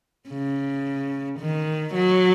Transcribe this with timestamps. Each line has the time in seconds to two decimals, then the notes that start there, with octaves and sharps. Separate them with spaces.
0.29 C#3
1.39 D#3
1.94 F#3